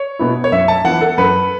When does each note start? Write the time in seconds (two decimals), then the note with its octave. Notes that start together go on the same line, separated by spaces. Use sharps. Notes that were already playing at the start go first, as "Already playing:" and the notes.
Already playing: C#5
0.19 B2 B3 E4
0.44 C#5
0.52 F#2 E5
0.68 A5
0.84 E3 B3 E4 F#5
1.01 A4
1.18 F#2 B4